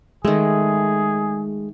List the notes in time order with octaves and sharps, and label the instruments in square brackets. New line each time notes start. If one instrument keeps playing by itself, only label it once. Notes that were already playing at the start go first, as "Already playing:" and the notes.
[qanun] D#3 A3 [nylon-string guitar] G#3 [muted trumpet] G#4